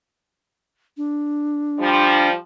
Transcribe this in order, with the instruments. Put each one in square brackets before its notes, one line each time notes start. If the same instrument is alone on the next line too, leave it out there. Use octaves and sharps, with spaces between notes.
[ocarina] D4
[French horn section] F3 G3